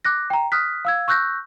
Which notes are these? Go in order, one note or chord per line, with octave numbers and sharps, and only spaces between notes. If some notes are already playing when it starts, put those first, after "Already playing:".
D6 F#6 A#6
G5 A#5
D#6 F6 F#6 B6
F5 E6 G#6
C#6 E6 F#6 G6 A#6